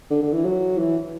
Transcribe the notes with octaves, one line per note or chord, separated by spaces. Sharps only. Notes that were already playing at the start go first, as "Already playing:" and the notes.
D3
D3
E3
F#3
E3